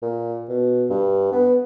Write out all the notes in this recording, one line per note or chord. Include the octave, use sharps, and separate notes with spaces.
A#2
B2
G2
B3